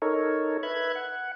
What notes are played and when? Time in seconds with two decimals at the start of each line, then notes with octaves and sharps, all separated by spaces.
0.02 D#4 A4 A#4 C#5
0.63 B4 E5 F#6 G#6
0.95 F#5